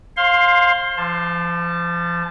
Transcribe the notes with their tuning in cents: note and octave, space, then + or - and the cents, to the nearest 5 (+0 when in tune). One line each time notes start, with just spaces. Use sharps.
C5 +35 F5 +10 C6 +0
F3 -30 A5 +0